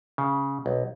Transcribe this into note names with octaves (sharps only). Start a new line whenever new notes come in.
C#3
B1